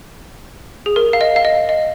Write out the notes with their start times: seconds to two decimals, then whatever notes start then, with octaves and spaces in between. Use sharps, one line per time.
0.86 G#4
0.96 A#4
1.13 F5
1.21 D#5
1.36 F5
1.45 D#5
1.69 D#5